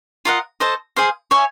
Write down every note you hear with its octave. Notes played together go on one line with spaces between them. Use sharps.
F4 A#4 D#5 F#5
A4 C5 D#5
G#4 C5 F5
C#5 E5 G#5